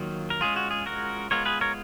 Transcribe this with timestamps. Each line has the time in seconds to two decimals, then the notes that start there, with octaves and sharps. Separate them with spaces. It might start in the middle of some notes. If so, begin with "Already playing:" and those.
Already playing: D#3 F#3 A#3 F4
0.30 A#4
0.41 G#3 C#4 F4 G#4
0.56 F#4
0.71 G#4
0.86 F#4 A#4
1.31 G#3 B3 F4 A#4 C#5
1.46 G#4 B4
1.61 A#4 C#5